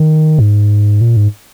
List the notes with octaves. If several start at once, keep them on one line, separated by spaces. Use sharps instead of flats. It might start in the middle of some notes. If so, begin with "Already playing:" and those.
Already playing: D#3
G#2
A#2
G#2